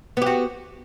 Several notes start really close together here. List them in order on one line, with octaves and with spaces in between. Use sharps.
B3 G4 F#4